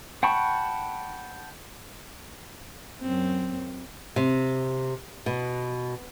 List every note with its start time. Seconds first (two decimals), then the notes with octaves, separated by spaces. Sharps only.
0.23 F#5 G5 A5 B5 C#6
3.01 F#2 C4
4.16 C3
5.26 B2